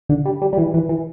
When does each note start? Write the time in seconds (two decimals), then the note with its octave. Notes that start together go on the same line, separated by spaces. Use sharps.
0.09 D3
0.26 G3
0.42 G3
0.53 G3
0.58 E3
0.74 E3
0.89 E3